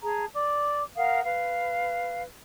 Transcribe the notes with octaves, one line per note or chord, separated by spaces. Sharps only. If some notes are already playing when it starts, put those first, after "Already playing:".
G#4 A5 A#5
D5 D6
A#4 F5 F#5 D#6
B4 F5